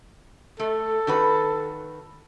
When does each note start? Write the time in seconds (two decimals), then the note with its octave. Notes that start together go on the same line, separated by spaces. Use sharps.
0.59 A3 A4
1.07 D#3 F#4 B4